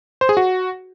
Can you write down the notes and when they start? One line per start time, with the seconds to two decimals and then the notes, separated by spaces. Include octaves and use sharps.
0.21 C5
0.29 G#4
0.37 F#4